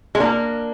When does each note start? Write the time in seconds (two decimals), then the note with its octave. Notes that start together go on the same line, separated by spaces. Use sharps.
0.15 G#3
0.20 A#3 D4